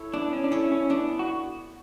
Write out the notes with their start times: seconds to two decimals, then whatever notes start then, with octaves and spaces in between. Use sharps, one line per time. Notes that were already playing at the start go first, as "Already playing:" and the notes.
Already playing: E4 A4 C#5
0.13 B3 D4
0.33 C#4
0.44 D4
0.51 C#4 E4 A4 C#5
0.72 C#4
0.90 B3 D4
1.19 F#4